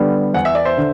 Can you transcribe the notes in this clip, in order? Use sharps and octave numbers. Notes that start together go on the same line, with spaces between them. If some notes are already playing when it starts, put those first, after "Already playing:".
Already playing: D3 G3 B3
E2 F#5
E5
D5
C5 E5
D3